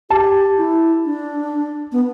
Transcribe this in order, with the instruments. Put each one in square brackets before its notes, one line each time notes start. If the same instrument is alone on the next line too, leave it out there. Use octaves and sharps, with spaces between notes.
[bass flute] G4 [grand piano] A5
[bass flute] E4
D4
B3